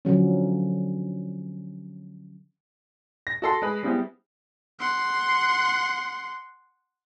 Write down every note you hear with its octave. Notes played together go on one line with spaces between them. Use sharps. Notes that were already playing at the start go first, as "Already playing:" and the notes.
D3 F3 F#3 C#4
A#6
F#4 A4 C6
G#3 B4 B5
G3 G#3 B3 C4 E4 G4
F#5 C6